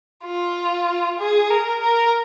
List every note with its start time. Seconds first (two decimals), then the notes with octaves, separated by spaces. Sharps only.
0.24 F4
1.19 G#4
1.50 A#4
1.81 A#4